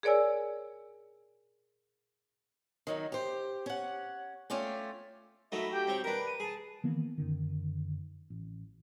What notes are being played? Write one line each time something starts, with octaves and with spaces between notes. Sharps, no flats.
G#4 A#4 C#5 D5 G#5 E6
D#3 F#3 D#4
G4 C5
C#4 F#5
A3 C#4 F4 D5 G5
F#3 A3 D#4 E5 B5
G4 G5
C4 C#5
D4 A#4 B4 D7
D#7
G#4 A5
D#3 E3 A#3 B3
F#2 D3 D#3
A1